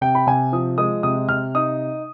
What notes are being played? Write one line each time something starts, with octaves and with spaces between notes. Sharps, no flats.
C3 G5
B5
C3 G#5
F3 D#6
G#3 D#6
C3 D#6
C3 F6
D#4 D#6